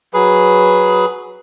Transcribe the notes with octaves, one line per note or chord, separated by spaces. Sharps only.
F#3 G#4 B4